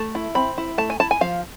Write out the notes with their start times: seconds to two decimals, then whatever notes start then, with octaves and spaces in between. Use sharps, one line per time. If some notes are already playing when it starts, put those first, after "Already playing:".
Already playing: A3 A5
0.15 E4
0.35 C4 B5
0.58 E4
0.78 A3 A5
0.90 G#5
1.00 E4 A5
1.11 G#5
1.21 F3 F5